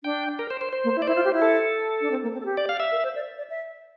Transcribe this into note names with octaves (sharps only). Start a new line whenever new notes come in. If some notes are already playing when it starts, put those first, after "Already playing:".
D4 G5
A#4
C5
C5
C5
A#3
E4
D5
E4 C5
F4
G4
E4
A4
D4
C4
A#3
C4
A4
G4
D5
F5
E5
A#4
C5
D5
D5
E5